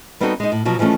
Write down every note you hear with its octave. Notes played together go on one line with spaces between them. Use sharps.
G3 B3 C4 D#4 F#4 A4
G#3 D#4
A2
B2 F3 F#3
E3 F3 G#3 A3 C#4